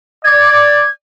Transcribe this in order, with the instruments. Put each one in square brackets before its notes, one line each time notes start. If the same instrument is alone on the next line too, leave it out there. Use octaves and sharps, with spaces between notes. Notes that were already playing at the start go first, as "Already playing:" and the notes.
[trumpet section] D5 [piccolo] G#6